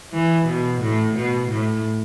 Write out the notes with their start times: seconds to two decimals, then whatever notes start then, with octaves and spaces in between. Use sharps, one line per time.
0.13 E3
0.47 B2
0.81 A2
1.16 B2
1.49 A2